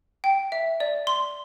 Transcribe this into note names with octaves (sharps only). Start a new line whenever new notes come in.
G5
E5
D5
C6